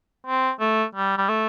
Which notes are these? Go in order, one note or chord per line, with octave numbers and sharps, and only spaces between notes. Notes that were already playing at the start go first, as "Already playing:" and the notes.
C4
A3
G3
G3
A3